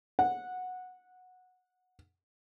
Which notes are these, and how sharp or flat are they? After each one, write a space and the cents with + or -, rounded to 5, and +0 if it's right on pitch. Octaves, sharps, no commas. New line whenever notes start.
F#5 -10